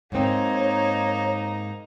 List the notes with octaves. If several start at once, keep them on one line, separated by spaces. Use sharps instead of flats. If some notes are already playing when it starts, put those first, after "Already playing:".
G#2 A#3 C4 D#4 C#5